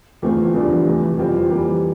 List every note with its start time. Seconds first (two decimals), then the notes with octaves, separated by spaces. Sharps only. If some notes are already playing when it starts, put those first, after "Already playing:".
0.22 E2 E3 A3 C4 F4
0.54 E2 E3 G3 D4 F4
0.85 C3 E3 A3
1.17 F2 E3 G3 C4 F4
1.49 E3 G3 A#3